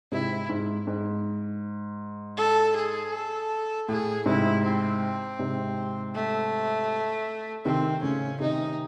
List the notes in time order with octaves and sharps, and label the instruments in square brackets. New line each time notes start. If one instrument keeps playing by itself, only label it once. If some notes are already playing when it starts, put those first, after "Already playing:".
[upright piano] G#2 C3 [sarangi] E4
[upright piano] G#2
G#2
[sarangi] A4
G#4
A4
[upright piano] A2 [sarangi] G#4
[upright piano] G#2 C3 [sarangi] E4
[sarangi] C4
[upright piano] G#2 C3
[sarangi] A3
[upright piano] C3 D#3 [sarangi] C4
[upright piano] A2 C#3 [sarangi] C#4
[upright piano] C3 D#3 [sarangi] D#4